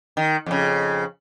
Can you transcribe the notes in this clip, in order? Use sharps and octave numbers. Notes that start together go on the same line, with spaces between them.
D#3
F2 C#3